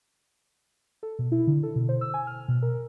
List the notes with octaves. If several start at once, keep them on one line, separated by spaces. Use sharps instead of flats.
A4
B2
E4
D3
A4
B2
C5
E6
G#5
F6
B2
A#4